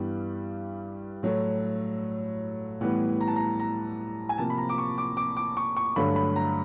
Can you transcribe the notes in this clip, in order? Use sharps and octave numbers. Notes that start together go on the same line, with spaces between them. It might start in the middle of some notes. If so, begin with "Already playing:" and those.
Already playing: G2 E3 G3 B3
A2 F#3 A3
A2 E3 G3 B3
A#5
A5
A#5
A#5
G#5
C3 F3 A#3 A5
B5
A#5
D6
C#6
D6
D6
D6
C#6
C#6
G2 D3 F#3 A3 B5
B5
A#5